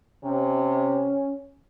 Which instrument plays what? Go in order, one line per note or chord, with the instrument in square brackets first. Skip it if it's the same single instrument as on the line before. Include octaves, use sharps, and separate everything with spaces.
[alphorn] C3 [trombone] C#4